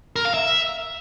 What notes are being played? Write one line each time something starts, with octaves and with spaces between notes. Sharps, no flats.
A#4
F5
E5